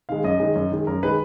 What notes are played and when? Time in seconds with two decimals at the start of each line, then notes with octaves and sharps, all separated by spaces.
0.09 D#3 G#3 F5
0.24 F#2 D#5
0.40 D#3 G#3
0.55 F#2
0.72 D#3 G#3
0.87 F#2 A#4
1.03 D#3 G#3 B4